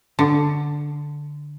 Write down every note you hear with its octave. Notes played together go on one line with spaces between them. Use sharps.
D3